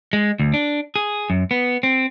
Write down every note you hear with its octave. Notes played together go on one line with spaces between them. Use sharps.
G#3
D2
D4
G#4
F#2
B3
C4